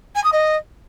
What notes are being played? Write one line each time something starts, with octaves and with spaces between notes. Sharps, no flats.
G#5
D#6
D#5